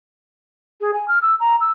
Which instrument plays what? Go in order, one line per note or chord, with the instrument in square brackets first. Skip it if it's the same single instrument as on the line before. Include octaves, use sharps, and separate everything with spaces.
[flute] G#4
G#5
F6
E6
A#5
E6